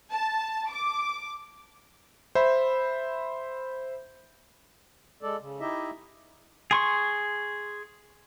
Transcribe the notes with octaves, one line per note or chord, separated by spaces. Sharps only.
A5
D6
C5 E5 B5
G#3 A4 D5
C#3
D#4 E4 G4 D#5 E5
G#4 C6 C#6